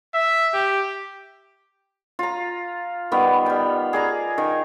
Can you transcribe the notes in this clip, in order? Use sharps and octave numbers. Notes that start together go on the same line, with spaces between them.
E5
G4
F4 A#5
D#3 G3 B3
G3 G5
G#4 D5 A#5
D#3